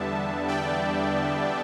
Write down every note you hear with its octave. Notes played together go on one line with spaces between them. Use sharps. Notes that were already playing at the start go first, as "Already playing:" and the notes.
Already playing: E2 D3 G3 B3 D4 E5 A5
D5 G5